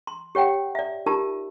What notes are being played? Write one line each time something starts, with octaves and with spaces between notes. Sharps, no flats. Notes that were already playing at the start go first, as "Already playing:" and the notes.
C6
G4 C#5 F#5 G5
D5 E5
D#4 F4 G4 A#4 A5